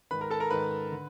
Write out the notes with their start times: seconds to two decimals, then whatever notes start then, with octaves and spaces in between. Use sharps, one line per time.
0.11 G#2 D#3 B4 B5
0.21 A#4 A#5
0.30 A4 A5
0.40 A#4 A#5
0.50 G#2 D#3 B4 B5
0.92 D3